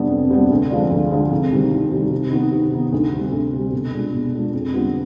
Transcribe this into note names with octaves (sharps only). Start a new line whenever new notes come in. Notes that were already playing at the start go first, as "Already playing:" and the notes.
Already playing: F2 C3 G3 B3 D4
F2
C3 G3 B3 D4
D2
D3 F3 G#3 D4
D2
D3 F3 G#3 D4
C2
C3 D#3 G3
C2
C3 D#3 G3
C3
D#3 B3 D#4
C3
D#3 B3 D#4
D2
C3 G3
D2
C3 G3
B2
G#3 D4 F4
B2
G#3 D4 F4
F2
D3 G3 B3 F4